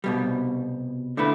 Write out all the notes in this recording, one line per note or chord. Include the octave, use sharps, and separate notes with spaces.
C2 B2 G3
D3 A3 E4 B4